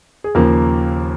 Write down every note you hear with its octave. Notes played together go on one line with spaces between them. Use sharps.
G#4
D#2 C#3 F3 A#3 A#4